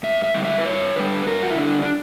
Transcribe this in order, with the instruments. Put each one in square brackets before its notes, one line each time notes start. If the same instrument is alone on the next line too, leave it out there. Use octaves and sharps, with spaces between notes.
[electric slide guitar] G2 E5
E5
D3 G3
E5
B4
G2 C#5
D3 G3 B4
G2 A#4
F#4
E4
D3 G3 D4
D4